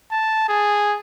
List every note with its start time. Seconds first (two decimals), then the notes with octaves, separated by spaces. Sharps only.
0.12 A5
0.49 G#4